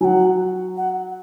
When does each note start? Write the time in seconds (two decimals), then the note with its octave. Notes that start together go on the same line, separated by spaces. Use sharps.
0.01 F#3 G#5
0.04 F#5
0.77 F#5